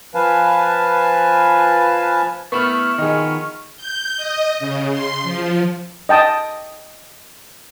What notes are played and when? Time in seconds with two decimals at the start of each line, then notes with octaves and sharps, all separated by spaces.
0.15 F3 B4 F5 G#5 A5
2.52 A3 B3 E4 C#6 F6
2.98 D#3 F3 B3 G#4 D#5
3.77 G6
4.17 D#5
4.59 C#3
4.90 C6
5.23 F3
6.09 D#5 G5 A5 D#6